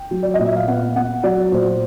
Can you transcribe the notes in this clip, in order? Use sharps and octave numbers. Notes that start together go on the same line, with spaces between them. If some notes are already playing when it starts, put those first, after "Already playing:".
Already playing: G5
F#3
D5
D#5
A#2
E5
F5
B3 F#5
B3 F#5
F#3 D5
A#2 C5